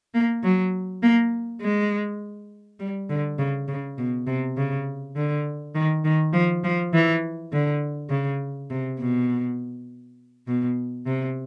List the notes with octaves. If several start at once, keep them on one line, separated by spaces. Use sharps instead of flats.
A#3
F#3
A#3
G#3
G3
D3
C#3
C#3
B2
C3
C#3
D3
D#3
D#3
F3
F3
E3
D3
C#3
C3
B2
B2
C3